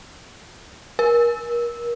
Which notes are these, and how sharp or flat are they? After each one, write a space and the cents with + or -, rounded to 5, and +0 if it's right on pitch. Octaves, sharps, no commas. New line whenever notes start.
A#4 +30